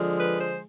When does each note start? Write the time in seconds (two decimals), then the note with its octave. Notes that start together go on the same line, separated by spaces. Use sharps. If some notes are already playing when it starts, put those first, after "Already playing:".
Already playing: D3 F3 G#3
0.20 B4
0.40 C5